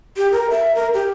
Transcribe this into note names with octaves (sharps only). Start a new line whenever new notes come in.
G4
A#4
E5
A#4
G4